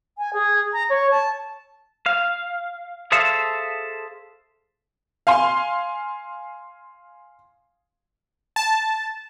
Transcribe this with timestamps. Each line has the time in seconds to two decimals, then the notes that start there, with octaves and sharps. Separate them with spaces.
0.17 G#5
0.33 G#4
0.72 A#5
0.89 C#5
1.10 A5
2.06 F5
3.12 G#4 A4 C5 E5 F5 A5
5.27 F5 G#5 C6
8.56 A5